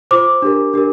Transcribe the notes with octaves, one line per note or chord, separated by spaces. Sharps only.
F4 C5 D6
D4 G4 A#4
D4 G4 A#4